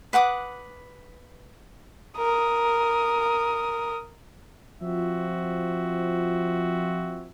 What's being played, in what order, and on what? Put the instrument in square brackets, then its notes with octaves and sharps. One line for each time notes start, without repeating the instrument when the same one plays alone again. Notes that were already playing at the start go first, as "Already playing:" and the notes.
[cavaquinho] B4 F#5 D6 D#6
[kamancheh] A#4 D#6
[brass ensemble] F3 C4 F4 F#4 E5